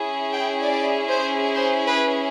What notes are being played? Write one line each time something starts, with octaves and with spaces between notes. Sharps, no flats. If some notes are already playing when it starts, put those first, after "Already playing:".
Already playing: C#4 E4 G#4
G5
D5
C5
C5
B4